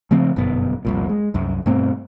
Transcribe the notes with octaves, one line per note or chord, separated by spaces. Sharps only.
C#3 F3 A3 C4
G1 F#2 B2 B3
F1 C2 A#2
G#3
C2 F#2
G2 B2 A3 C4